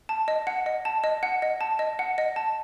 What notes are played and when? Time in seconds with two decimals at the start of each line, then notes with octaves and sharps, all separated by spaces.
0.09 A5
0.28 D#5
0.47 F#5
0.66 D#5
0.85 A5
1.04 D#5
1.23 F#5
1.42 D#5
1.61 A5
1.79 D#5
1.99 F#5
2.18 D#5
2.36 A5